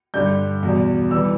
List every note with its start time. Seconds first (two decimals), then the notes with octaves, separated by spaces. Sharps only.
0.14 G2 D3 G3 G6
0.63 E2 B2 G3
1.11 E3 G3 E6